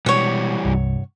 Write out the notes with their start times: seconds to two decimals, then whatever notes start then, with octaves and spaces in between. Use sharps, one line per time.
0.06 B2 E3 G3 G#3 C#5 F#5
0.65 C2 G2 C3